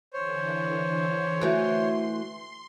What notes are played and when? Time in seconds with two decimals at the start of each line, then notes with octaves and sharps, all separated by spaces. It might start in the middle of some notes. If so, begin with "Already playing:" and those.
0.13 D3 E3 C5 C#5
1.41 E3 A3 F#4 C6